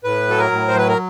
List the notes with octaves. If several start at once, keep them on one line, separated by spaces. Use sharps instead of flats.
A2 B4
F#3 A4
A#4
A2
C5
F#3 B4
A#4